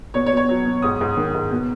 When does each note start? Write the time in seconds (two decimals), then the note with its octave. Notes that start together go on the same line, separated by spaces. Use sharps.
0.14 B2 C#5
0.26 C#5
0.31 B2
0.37 C#5
0.49 F#3
0.65 B2
0.82 G#2 D#6
1.01 G#2
1.17 D#3
1.34 G#2
1.51 B2